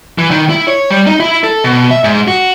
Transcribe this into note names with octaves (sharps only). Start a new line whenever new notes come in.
E3
D#3
E4
C#5
G3
D#4
E4
A4
B2
E5
G#2
F#4